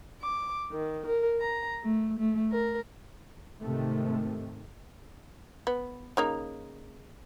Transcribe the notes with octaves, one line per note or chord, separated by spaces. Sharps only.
D6
D#3
A#4
A#5
A3
A3
A#4
G#2 C3 D#3 A3
B3
C#3 A#3 D#4